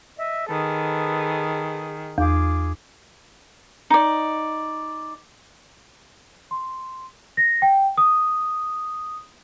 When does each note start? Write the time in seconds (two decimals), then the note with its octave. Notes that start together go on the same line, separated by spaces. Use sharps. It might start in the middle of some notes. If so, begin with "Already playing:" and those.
0.17 D#5 E5
0.49 D#3 G#4 A4 B4
2.18 E2 F4 G#4 D6
3.90 D#4 D5
6.51 C6
7.37 A#6
7.62 G5
7.97 D#6